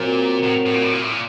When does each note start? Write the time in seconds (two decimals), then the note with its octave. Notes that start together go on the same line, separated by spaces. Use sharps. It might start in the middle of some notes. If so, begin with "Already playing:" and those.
Already playing: A#2 F#3 C4 F#4 A#4
0.44 A2
0.66 A2
0.74 A#2
0.84 A2
0.92 A#2
1.02 A2
1.11 A#2